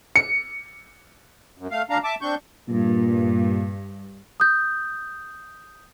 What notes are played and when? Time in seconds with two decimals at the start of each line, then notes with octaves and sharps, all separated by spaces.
0.16 C#7
1.58 F#2
1.71 A3 F5
1.90 D2 D4 F5 A#5
2.04 E5 A5 D6
2.22 C4 D4 C#6 G6
2.69 G2 A#2
4.40 D#6 G6